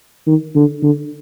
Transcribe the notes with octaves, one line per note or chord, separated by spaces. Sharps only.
D#3
D3
D3